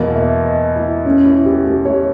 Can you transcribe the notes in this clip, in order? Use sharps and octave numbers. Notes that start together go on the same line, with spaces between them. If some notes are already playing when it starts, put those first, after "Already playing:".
Already playing: E2 B2 A#3 D#5
E5
D#5
E4
C#4
E4
G4
G4
C#5